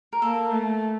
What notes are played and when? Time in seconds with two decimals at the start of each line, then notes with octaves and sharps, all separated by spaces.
0.13 A#4
0.22 A#3 A4
0.52 A3